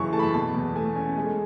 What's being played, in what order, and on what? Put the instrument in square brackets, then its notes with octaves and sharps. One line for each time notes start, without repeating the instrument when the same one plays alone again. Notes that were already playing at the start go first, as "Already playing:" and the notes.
Already playing: [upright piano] F#2 C#3 E3 A5 C#6
A3 A5
B5
A5
B2 A5
E2
A3 G#5
C#4
G#3